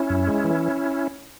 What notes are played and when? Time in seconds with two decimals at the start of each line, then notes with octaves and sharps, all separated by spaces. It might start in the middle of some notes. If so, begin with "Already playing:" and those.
Already playing: C#4 E4
0.10 F#2
0.27 G#3
0.44 E3